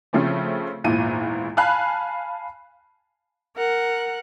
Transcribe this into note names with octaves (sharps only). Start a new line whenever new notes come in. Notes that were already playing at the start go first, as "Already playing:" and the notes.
C#3 F3 A3 C4 C#4
G#1 E2 A#2 E4 D#7
F5 G#5 A5 B5 F#6
A#4 F#5